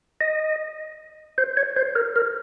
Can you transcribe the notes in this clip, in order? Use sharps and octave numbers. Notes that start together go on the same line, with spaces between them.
D#5
C5
C#5
C5
A#4
A#4